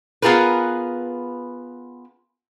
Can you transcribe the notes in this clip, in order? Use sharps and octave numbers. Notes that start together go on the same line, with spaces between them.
B3 F4 G#4 A#4 B4